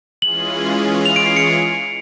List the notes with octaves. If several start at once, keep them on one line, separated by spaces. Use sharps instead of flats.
E3 G#3 C#4 F4 G#4 F#7
F7
D7
C7
C#7